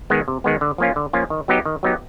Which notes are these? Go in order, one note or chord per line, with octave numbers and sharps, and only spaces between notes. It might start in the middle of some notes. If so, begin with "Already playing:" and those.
D#3 G#3 B3
C3
D#3 G#3 B3
D3
F3 A#3 C#4 F4
D3
F3 A#3 C#4 F4
D#3
F#3 B3 D#4 G4
D#3
F#3 B3 D#4 G4